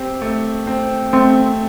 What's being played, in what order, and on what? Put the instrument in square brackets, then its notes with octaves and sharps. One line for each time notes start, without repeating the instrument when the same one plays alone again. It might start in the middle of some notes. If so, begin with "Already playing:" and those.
Already playing: [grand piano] C4 G4
A3
C4
[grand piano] A3 [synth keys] C4